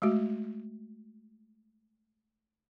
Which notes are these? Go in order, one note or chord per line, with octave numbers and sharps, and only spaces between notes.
G#3 A3 F#4